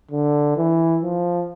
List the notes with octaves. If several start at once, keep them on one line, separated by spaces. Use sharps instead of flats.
D3
E3
F3